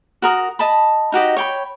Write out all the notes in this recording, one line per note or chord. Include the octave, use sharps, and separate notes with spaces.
F#4 A#4 D#6
D#5 A5 B5
D#4 F#4 G4 D#5
C#5 G5 B5